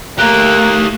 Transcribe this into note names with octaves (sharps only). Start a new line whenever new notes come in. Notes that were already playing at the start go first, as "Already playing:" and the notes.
A3 A#3 G4 A#4 F#6